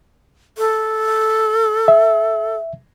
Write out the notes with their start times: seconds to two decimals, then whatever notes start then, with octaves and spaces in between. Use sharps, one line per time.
0.58 A4
1.88 E5